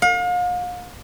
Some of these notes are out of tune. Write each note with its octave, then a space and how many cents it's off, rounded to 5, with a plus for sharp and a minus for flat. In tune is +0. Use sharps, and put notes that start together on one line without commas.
F5 +40